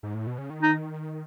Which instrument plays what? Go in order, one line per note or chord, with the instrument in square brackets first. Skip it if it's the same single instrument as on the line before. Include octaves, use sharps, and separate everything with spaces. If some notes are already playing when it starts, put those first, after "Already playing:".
[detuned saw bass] G#2
A2
B2
C#3
D#3
[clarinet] D#4